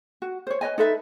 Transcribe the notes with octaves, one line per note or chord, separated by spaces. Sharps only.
F#4
C5 C#5
B4 C#5 D#5 G#5
D#4 A4 B4 E5